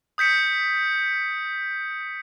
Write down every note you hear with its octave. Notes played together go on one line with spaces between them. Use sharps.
D#6 G6 B6 C#7